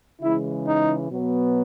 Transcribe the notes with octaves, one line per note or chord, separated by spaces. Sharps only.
C#3 E3 G#3 E4
D#4
B2 F#3 B3